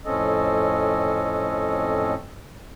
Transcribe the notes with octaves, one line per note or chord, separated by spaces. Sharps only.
F2 A2 C4 C#4 A4 D#5